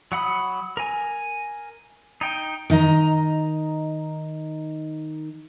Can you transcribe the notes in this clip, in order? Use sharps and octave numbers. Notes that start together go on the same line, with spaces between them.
F#3 F#5 B5 D#6
A#4 G#5
D#4 G5
D#3 D#4 D#5 A#5